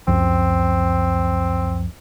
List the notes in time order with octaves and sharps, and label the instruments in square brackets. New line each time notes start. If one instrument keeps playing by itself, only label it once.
[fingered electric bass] C#2 F#2 F3 [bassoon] C4